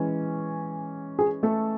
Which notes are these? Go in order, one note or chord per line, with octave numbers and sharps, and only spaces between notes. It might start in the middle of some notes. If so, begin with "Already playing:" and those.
Already playing: E3 G#3 C#4
G#4
A3 A4